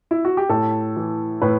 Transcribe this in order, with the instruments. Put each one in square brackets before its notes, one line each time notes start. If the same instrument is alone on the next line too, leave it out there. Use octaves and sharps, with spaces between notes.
[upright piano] E4
F#4
G4
A2 A4
E3
A2 B4